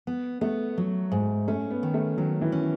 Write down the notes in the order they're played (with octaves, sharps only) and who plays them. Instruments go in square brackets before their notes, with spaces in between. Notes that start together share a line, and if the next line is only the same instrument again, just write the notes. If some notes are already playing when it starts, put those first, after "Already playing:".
[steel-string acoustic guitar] B3
[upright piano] A3 [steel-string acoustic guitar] B3
[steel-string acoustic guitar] F#3
G#2
[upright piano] A3 [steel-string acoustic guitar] C#4
[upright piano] B3
[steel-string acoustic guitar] D#3
[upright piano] A3
[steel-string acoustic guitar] D#3 [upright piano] F#3
[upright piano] E3
[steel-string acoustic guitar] C#4